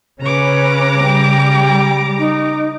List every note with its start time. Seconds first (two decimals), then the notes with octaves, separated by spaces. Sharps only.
0.21 C#3 C#4 B4 A#5 D6
1.02 G3 G5
2.18 D#4